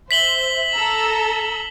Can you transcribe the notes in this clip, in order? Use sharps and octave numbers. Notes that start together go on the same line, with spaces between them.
C5 E5 B6 F#7 G7
A4 A#5 E6